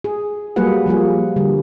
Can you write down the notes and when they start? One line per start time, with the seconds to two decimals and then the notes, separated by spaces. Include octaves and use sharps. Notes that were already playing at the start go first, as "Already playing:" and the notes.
0.04 G#4
0.56 F#3 G3 A#3 G#4 B4 F#5
0.86 F3 G3 A#3 G#4
1.36 D3 G3